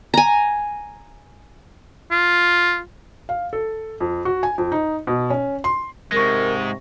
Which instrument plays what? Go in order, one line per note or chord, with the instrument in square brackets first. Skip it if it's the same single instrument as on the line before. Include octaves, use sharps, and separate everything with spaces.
[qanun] G#5 A#5
[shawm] F4
[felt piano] F5
A4
F2
F#4
G#5
F2
D#4
B2
C#4
C6
[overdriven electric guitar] G#2 G#3 [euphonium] C3 [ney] A#4 [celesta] C#6 A#6